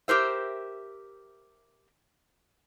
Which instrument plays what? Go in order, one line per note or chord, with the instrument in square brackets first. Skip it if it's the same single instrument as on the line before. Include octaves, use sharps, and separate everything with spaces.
[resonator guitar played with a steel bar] G4 A#4 C5 E5